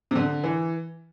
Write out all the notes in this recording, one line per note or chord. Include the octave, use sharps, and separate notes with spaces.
C3
D3
E3